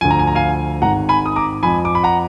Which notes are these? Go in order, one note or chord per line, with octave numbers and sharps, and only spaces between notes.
D2 D3 F3 G#5
A#5
G#5
A#5
F5 G#5
G#1 G#2 D#3 F#5 A#5
G#5 B5
D#6
A#5 D6
F2 F3 G#5 B5
D6
B5
F#5 A#5